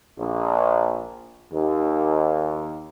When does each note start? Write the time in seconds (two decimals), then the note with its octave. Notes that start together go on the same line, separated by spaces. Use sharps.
0.18 A#1
1.51 D#2